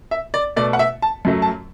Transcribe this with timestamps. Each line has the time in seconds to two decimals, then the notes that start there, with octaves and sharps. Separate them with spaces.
0.11 E5
0.34 D5
0.56 B2 A3 D5
0.73 F#5
0.79 E5
1.02 A5
1.25 F#2 F#3 A3
1.42 A5